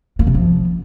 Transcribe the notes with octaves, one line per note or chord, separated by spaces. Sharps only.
A#3
C3
F3